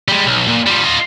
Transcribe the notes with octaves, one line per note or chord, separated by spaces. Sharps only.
G3 G#3
B1
A#2
F3 G3
F4 D#5